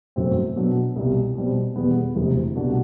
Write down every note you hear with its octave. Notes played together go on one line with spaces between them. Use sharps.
G1 F#2 F#3 A3 C4
B2 F#3 B3 D4 F#4
C2 B2 G3
B2 G3 C4
E2 B2 G3 B3
E1 D2 C3 E3
C2 B2 A3 D4 F#4